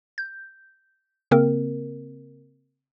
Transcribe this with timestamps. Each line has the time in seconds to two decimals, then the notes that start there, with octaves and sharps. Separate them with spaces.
0.18 G6
1.31 C#3 A#3 C4 A#4